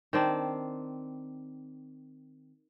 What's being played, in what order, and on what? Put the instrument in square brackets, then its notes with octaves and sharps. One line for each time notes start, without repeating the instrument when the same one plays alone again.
[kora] D#3 C4 D4